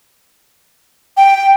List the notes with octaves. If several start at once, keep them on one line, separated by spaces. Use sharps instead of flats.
G5